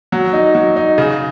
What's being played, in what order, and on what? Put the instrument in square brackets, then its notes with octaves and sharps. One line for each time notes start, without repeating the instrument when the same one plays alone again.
[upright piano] F#3
D#4
F#3
D#4
C#3